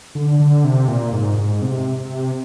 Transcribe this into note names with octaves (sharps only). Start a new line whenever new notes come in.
D3
D3
C3
A#2
G#2
G#2
C3
C3